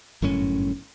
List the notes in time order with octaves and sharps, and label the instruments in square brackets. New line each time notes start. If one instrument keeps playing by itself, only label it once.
[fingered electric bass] G1 F#2 A2 C#4